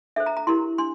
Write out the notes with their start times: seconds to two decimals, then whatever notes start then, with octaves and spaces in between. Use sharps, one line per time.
0.16 D4 A4 C5 E5
0.26 A#5
0.37 A#5
0.47 E4 G4 A#4 C6
0.78 D4 C6